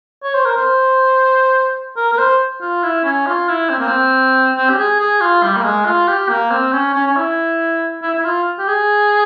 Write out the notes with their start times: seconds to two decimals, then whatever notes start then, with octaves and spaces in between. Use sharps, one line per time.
0.23 C#5
0.34 C5
0.45 A#4
0.57 C5
1.97 A#4
2.12 A#4
2.18 C5
2.61 F4
2.83 E4
3.04 C#4
3.27 F4
3.49 E4
3.70 C4
3.79 A#3
3.88 C4
4.56 C4
4.69 G4
4.78 G#4
5.00 G#4
5.21 F4
5.43 G3
5.56 A#3
5.64 G#3
5.85 F4
6.08 G4
6.29 A#3
6.51 C4
6.73 C#4
6.94 C#4
7.07 C#4
7.16 E4
8.02 E4
8.14 E4
8.24 F4
8.59 G4
8.68 G#4